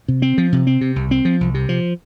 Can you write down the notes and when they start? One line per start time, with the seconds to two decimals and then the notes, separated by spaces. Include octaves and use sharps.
0.08 C3
0.22 C4
0.38 F3
0.52 C3
0.67 C4
0.81 C3
0.96 C2
1.11 C4
1.25 F3
1.41 C2
1.54 C3
1.69 F3